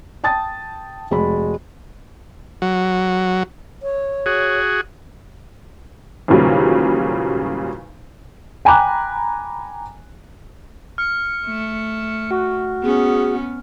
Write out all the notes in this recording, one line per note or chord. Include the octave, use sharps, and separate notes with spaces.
G5 A5 D#6 A6
F1 G#3 F#4 B5
F#3
C#5
F#4 G#4
G#1 E2 A#2 C#3 F#3 G3
G5 G#5 A#5 B5 D6 F#6
F6 C#7
A3
F#4
B3 C#4 G#4